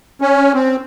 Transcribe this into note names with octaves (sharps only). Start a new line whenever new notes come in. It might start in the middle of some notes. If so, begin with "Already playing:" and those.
C#4
C4